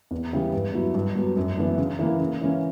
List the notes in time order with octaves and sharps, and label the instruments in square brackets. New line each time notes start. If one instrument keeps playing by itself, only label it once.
[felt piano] E2
C#3 E3 G3 B3
G2
F#3 B3 E4
G2
F#3 B3
F#2
E3 B3 D4
C#3
E3 A#3 E4
C#3
E3 A#3 C#4